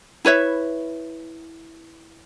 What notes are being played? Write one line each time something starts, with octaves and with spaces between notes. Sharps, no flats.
E4 B4 C#5 E5